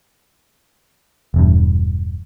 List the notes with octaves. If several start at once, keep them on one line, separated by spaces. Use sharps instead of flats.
E1 E2 G2